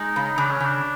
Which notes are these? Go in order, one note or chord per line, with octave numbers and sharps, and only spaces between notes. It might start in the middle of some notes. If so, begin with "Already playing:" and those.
Already playing: G#3 D#4
C#3
C#3 D4
C#4
C#3 D4